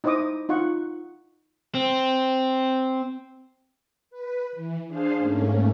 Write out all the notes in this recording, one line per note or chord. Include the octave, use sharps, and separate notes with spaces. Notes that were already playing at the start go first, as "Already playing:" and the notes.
D#4 E4 C5 D#5 D6 D#6
D#4 F4 F5 F#5 C#6
C4
B4
E3
D4 G#4 C5 F5
G#2 A3 A#3 C#4